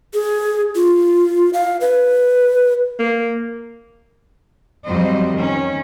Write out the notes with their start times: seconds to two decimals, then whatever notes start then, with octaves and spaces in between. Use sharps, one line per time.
0.14 G#4
0.76 F4
1.53 F5
1.81 B4
2.99 A#3
4.85 F2 F#3 G3 C5 D#5
5.34 D#3 C#4